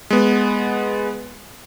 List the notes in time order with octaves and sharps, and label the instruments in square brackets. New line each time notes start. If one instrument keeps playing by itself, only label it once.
[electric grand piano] G#3 B3